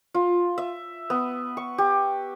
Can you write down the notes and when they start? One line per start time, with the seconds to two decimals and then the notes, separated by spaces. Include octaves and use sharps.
0.14 F4
0.58 E5
1.10 B3
1.57 C#6
1.78 G4